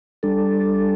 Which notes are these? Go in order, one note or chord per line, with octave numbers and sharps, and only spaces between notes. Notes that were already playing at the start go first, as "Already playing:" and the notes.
G3 D4 A4